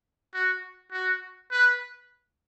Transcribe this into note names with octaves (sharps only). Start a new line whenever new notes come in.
F#4
F#4
B4